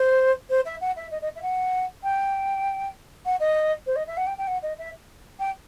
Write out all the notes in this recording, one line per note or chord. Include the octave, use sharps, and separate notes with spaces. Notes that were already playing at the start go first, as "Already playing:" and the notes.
Already playing: C5
C5
E5
F#5
E5
D#5
D#5
E5
F#5
G5
F#5
D#5
C5
D#5
E5
F#5
G5
G5
F#5
D#5
E5
G5